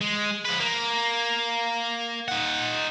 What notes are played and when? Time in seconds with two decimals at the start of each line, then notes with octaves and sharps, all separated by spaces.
0.01 G#3
0.45 F3 B4
0.60 A#3
2.28 D#4 F#5